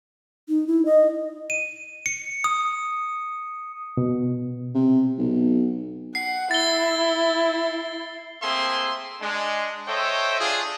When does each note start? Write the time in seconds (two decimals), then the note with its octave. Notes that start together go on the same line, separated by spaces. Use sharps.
0.49 D#4
0.67 E4
0.85 D#5
1.50 D#7
2.06 C#7
2.44 D#6
3.97 B2
4.74 C3
5.18 B1
6.15 F#5 C7
6.51 E4 A6 G7
8.42 A3 A#3 C4 G#4 E5 C6
9.21 G#3 D4
9.87 A4 C5 C#5 D#5 E5 G5
10.40 D4 F4 G#4